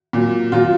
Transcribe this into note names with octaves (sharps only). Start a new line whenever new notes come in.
A#2 F#3
A#2 F#3 F4